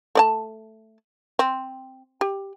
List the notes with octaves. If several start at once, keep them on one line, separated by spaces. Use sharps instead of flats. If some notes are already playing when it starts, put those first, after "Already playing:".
A3 D5 A5
C4
G4